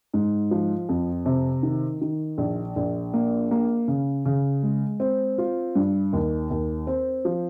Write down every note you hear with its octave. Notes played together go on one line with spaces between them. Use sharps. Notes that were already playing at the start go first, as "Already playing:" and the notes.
G#2
F3
F2
C3
D#3
D#3
A#1
A#1
A#3
A#3
C#3
C#3
G#3
C4
F4
G2
D#2
D#2
C4
F3